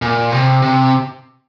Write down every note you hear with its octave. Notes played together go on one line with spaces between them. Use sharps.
A#2
C3
C3